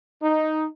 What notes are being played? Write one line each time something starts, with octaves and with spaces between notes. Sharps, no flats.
D#4